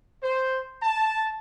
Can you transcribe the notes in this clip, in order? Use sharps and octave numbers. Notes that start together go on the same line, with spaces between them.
C5
A5